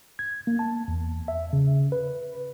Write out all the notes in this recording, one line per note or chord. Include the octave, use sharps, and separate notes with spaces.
G#6
A#3
A5
E2
E5
C#3
B4